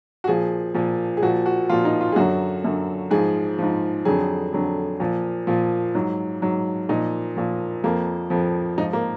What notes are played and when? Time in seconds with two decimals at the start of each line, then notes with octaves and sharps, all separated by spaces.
0.24 F#4
0.28 A#2 F3 G#4
0.74 A#2 F3
1.17 G#4
1.22 A#2 F3 F#4
1.46 F#4
1.69 A#2 F3 F4
1.85 D#4
2.01 F4
2.12 G#4
2.16 F#2 D3 F#3 F#4
2.64 F#2 D3 F#3
3.10 G#2 F3 G#4
3.58 G#2 F3
4.05 F2 D3 F#3 G#4
4.53 F2 D3 F#3
5.00 A#2 F3
5.47 A#2 F3
5.95 G#2 F#3
6.42 G#2 F#3
6.89 A#2 F3 D#4
7.36 A#2 F3
7.84 F2 F3 A#3
8.30 F2 F3
8.78 G#2 F3 D#4
8.93 A#3